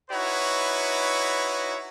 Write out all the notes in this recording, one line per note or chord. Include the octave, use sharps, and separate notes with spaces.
D#4 E4 F#4 B4 C#5